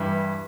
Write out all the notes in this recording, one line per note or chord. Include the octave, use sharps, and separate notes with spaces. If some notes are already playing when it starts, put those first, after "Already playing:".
Already playing: G2 E3